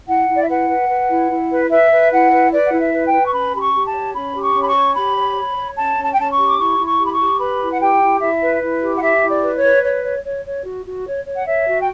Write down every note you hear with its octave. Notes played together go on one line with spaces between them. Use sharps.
E4 F#5
E4
D5
E5
B4 F#5
B4
B4
E4
E4
B4
B4 E5
B4
E4 F#5
B4
B4 D5
F#5
E4
E5
B4
G5
B4
C#6
C#4 B5
G4 B5
C#6
G4
A5
C#5
C#4 B5
G4
C#6
C#4
B5
C#6
C#5
G4 B5
C#5
C#5
C#5
C#4 A5
C#4
A5
G5
C#4 A5
C#6
G4
D6
E4 C#6
E4
C#6
G4
B5
C#6
G4
B4 B5
E4
F#5
G4 G5
E4
E4 E5
B4
E4
G4
F#5
G4 E5
E4
D5
B4
C#5
B4
C#5
C#5
C#5
C#5
F#4
F#4
C#5
C#5
F#5
C#5 E5
F#4
G5